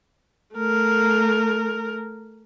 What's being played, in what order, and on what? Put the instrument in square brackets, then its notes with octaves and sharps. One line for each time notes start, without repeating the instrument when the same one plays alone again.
[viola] A3 A#4